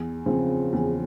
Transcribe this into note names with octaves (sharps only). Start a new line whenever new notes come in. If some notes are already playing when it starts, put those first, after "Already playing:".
Already playing: E2
C#3 F3 C4
E2